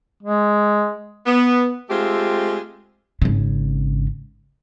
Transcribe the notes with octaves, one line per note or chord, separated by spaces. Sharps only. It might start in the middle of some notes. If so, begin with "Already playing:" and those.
G#3
B3
G#3 A3 C4 F4 G4
G#1 C#3